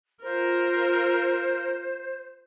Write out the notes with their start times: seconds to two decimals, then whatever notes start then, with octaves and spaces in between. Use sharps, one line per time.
0.23 F4 A#4 C5